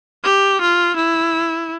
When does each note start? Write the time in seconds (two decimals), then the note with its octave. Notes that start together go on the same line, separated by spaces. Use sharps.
0.24 G4
0.61 F4
0.96 E4